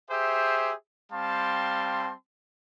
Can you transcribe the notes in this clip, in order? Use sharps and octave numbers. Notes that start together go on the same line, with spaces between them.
G4 G#4 C5 E5
G3 C4 F5 A5 C6